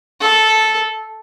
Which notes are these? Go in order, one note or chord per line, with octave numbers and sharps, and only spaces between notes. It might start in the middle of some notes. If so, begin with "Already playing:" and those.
A4